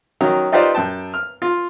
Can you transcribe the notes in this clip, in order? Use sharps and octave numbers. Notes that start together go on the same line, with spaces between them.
D#3 F#3 C#4
D#4 F4 G4 B4 C5 D5
F#2 G5 A5
F6
F4